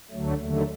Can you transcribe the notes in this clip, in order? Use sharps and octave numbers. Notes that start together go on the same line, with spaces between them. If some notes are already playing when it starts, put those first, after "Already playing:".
D2 D3 F#3 A3
D#2 D3 F#3 A3